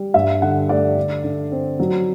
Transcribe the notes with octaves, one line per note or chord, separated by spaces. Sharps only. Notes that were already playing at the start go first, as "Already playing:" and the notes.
Already playing: G3
G2 E5
D3 F#5
A3 D5
D3
D3
C4
F#3